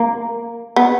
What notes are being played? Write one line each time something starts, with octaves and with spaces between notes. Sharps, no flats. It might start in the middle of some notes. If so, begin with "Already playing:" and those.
Already playing: A#3
B3